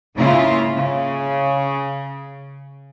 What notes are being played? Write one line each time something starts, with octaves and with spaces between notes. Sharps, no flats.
G#2 C#3 A#3 E4 F4
C#3